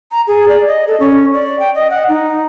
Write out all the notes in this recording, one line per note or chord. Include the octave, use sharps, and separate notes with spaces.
A#5
G#4
D5
D#5
A4
C#4
D5
G5
D#5
F#5
D#4